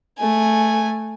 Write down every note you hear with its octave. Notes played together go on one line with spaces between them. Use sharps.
A3 G#5